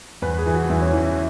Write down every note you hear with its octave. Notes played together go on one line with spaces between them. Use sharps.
E2 B4
G#4
E3
F#4
E2 E4
C#4
E3 E4
E4